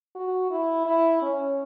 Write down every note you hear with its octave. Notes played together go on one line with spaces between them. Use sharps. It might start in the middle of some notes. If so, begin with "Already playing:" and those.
F#4
E4
E4
C#4